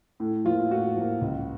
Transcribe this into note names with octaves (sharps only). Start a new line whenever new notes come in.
A2
F3 A#3 F4
A2 F#4
F3 A#3
C#2